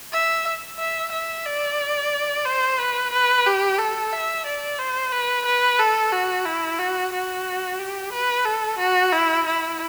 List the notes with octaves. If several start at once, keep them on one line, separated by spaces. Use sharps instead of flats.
E5
E5
E5
D5
C5
B4
B4
G4
A4
E5
D5
C5
B4
B4
A4
F#4
E4
F#4
F#4
G4
B4
A4
F#4
E4
E4